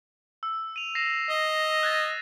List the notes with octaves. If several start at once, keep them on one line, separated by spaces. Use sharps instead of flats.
E6
D#7 F7
A#6 C7 E7
D#5
F#6 G#6 A6